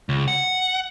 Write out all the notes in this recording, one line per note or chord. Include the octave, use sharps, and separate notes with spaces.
C#2
F#5